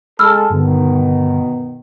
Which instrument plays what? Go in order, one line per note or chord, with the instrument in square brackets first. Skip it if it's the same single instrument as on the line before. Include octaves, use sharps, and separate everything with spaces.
[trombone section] G#3 A4 [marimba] B5 E6 F6
[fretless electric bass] G2 D3 G3 [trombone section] B2 D#3